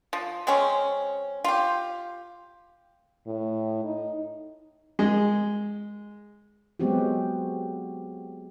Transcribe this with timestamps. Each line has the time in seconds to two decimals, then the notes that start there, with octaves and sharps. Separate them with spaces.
0.13 F3
0.47 G#3 C4 C#4
1.44 F4 G4
3.26 A2
3.84 D#4
4.99 G#3
6.80 F#3 G#3 B3 C4 F#4 G4